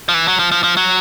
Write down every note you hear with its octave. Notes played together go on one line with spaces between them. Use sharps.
F3
E3
F#3
F3
F3
F3
F#3